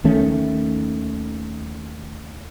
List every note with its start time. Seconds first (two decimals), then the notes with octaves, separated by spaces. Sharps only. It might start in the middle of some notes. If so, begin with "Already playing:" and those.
0.04 D#2 D#3 A3 C#4